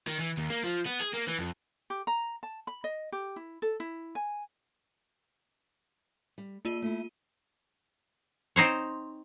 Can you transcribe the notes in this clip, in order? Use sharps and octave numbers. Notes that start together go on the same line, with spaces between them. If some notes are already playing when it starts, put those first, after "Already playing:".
D#3
E3
D#2
A#3
F3
B3
G#4
A#3
E3
F2
G4
A#5
A5
B5
D#5
G4
E4
A4
E4
G#5
G3
A#3 F4 D5 D#7
A3 E4
C4 D#4 C5 C#5